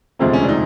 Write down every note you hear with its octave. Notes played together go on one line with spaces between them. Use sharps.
E1 D2 C3 F3 G#3 C4
C#4
D4
D#4